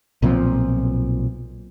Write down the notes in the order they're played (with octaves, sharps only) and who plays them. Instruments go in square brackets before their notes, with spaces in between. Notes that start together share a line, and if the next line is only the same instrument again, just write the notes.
[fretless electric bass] B1 A#2 F3 C4